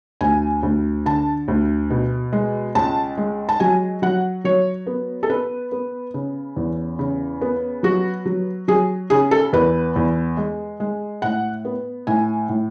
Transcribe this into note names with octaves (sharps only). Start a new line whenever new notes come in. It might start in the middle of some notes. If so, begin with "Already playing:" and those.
D2 G#5
D2
D3 A5
D2
B2
G#3
C#2 A5
G#3
A5
F#3 G#5
F#3 F#5
F#3 C#5
B3
A4
B3 B4
B3
C#3
E2
C#3
B3
F#3 F#4
F#3
F#3 G#4
C#3 G#4
A4
E2 B4
E2
G#3
G#3
A2 F#5
B3
A2 G#5
A2